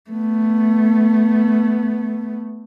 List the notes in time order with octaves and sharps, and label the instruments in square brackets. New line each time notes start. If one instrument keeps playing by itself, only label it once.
[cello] A3 B3